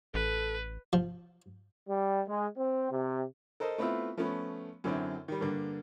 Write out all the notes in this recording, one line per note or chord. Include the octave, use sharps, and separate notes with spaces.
A1 A4 B4
F3
G3
G#3
C4
C3
A4 A#4 C5 D#5
A3 B3 C4 E4 F4 E5
F3 A3 B3 C#4
F#2 D3 F#3 C4 E4
D#3 G3
G2 D3 A#3